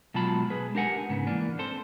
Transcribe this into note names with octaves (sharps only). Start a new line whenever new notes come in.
B2 F#3 G#3 F4 A5 B5
G#3 G#4 B4
D4 G4 A#4 F#5 G#5
G#2 C#3 B3
E3 A#3 D4
C4 A4 C5